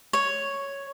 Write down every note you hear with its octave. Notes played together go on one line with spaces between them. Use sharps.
C#5